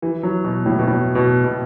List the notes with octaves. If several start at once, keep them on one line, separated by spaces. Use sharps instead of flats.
E3
F#3
B2
A2
B2
A2
B2
B2